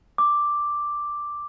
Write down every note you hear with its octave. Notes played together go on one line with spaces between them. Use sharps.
D6